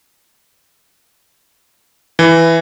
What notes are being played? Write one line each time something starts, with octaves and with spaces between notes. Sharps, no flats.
E3